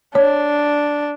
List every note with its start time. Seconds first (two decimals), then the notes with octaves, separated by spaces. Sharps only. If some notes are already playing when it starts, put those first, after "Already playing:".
0.15 D4 C#5